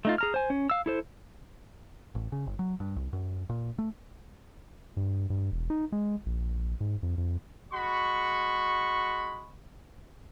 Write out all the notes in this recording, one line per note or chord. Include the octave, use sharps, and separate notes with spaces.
A3 D#4 F4
G#4 A#5 F6
C5 G#5
C#4
F5 E6
E4 A4 C5
A1
C#3
G1
F#3
G2
C2
F#2
A#2
A3
G2
G2
E1
D#4
G#3
A#1
G#2
F2
F2
G#3 F#4 B5 C#6